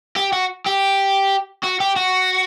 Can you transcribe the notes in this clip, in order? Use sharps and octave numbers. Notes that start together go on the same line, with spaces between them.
G4
F#4
G4
F#4
G4
F#4